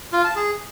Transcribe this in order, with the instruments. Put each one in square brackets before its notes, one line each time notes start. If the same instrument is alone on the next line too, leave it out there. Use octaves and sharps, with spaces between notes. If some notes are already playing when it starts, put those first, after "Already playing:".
[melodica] F4
A5
G#4